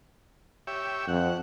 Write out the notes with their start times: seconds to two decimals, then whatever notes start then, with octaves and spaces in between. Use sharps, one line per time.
0.67 G4 C#5 E5
1.08 F2 F#5